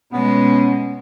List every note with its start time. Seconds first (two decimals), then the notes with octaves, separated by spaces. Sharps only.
0.13 B2 G#3 B3 C#4